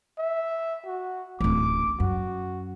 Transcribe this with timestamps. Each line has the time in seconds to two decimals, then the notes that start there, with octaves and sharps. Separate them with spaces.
0.18 E5
0.86 F#4
1.41 D1 A1 D6
2.00 F#2 F#4